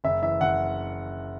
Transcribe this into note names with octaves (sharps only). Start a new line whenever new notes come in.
F#1 E5
E3 E5
F#1 F#5